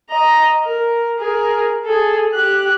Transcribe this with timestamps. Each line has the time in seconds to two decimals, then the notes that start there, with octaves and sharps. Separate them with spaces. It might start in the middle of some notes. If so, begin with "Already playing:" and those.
0.10 D#5 A#5
0.64 A#4
1.18 G#4 A#4
1.85 G#4 A4
2.34 G4 F#6